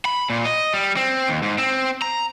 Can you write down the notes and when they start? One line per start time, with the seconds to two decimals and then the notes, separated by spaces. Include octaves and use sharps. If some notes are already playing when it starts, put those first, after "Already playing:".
0.05 B5
0.30 A#2
0.45 D#5
0.74 G3
0.97 C4
1.28 D#2
1.43 G#2
1.58 C4
2.02 A#5